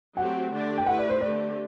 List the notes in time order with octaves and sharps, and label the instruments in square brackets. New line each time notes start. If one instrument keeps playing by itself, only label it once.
[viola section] F#3 A3 C4 G4 [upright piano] F#5
[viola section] D3 A3 D4 G4 D5
[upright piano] G5
[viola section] A3 E4 G4 B4 [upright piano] F#5
[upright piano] D5
C5
[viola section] D3 A3 C4 G4 [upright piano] D5